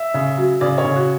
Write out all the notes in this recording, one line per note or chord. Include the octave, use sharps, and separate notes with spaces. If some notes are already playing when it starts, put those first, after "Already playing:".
Already playing: E5
C#3
F#3
C#3 D5
C#5
C#3
F#4